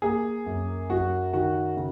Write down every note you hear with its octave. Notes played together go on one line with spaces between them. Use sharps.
A#3 G#4
F#2
F#2 F#4
D#3 F#4
C#3